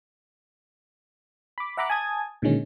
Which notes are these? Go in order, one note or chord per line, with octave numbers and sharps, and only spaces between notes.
B5 D6
E5 F#5 A#5 B5 D6 F#6
G#5 A5 D#6 G#6
A#2 D3 D#3 G#3 C#4